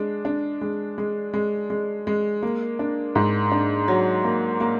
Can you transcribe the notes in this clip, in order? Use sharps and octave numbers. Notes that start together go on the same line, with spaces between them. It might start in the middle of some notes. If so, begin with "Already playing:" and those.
Already playing: G#3 D4
D4
G#3
G#3
G#3
G#3
G#3
A#3
D4
G#2
D4
F#3
A#3
A#3